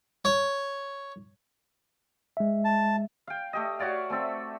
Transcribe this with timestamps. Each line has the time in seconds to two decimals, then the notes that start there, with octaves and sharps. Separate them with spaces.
0.25 C#5
2.37 G#3 E5
2.65 A5
3.27 F5 G5
3.53 A3 G4 D#5
3.79 F#4 C#5 D5 F5
4.10 A3 C4 A4 E5